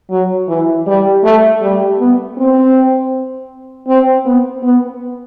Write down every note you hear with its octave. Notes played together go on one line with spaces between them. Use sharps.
F#3
E3
G3
A3
G3
B3
C4
C4
B3
B3